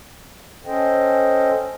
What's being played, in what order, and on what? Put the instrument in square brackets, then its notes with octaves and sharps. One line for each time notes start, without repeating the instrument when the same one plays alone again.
[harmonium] C#4 A4 C5 D#5 G5